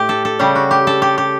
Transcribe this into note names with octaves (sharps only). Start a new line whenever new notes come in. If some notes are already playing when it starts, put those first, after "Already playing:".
Already playing: A2 A3 G4
A4
A4
C#3 G3 G4
F#4
G4
A4
G4
G4